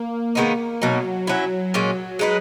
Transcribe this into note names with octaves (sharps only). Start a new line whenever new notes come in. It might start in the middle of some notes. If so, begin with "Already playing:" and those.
Already playing: A#3
D#3 G#3 B3 D#4
B2 F#3 A#3 D#4
F#3 C#4 E4
A#2 F#3 G#3 C#4
G#3 D#4 F#4 B4